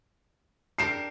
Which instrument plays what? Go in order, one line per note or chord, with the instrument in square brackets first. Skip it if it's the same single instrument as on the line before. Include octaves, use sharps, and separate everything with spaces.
[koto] D4 G4 A#4 [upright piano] C7 E7